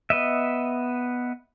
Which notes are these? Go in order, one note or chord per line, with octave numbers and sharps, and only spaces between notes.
B3 D#5 E5